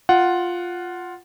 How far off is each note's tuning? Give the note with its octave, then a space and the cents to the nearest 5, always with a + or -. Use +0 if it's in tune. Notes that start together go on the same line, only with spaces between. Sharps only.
F4 +5 F#5 +5